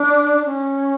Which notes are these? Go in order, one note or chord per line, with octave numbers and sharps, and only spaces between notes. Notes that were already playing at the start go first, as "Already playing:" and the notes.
Already playing: D4
D4
C#4